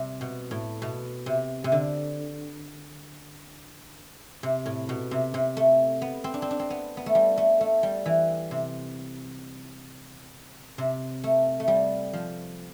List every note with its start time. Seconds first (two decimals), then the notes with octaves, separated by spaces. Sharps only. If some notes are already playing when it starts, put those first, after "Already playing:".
Already playing: C3 G3
0.21 B2
0.51 A2
0.82 B2
1.26 C3
1.64 C3
1.72 D3
4.43 C3
4.66 A2
4.89 B2
5.11 C3
5.34 C3
5.57 A3
6.02 B3
6.24 C4
6.34 D4
6.42 C4
6.51 D4
6.59 C4
6.70 B3
6.97 B3
7.06 A3
7.15 G3
7.37 A3
7.61 A3
7.83 G3
8.06 E3
8.51 C3
10.78 C3
11.24 A3
11.60 A3
11.68 G3
12.13 F3